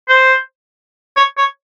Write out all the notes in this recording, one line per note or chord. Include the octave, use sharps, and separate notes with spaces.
C5
C#5
C#5